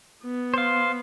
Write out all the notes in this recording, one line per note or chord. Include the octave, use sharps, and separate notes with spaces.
B3
C5 F5